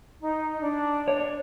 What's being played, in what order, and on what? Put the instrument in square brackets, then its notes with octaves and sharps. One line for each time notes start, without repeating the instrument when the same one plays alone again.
[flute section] D#4
D4
[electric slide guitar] C#5